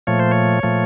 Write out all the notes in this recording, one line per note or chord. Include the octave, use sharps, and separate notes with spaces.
A#2 F3 A3 C#5
C5
C#5
A#2 F3 A3